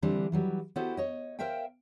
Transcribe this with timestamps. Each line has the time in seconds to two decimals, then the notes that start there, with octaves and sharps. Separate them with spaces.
0.02 D3 E3 G3 C4 D4
0.32 E3 F#3 G3
0.76 B3 E4 F#4 G4 A4 C5
0.97 C#5 D#5
1.39 A#4 C5 E5 F5 G5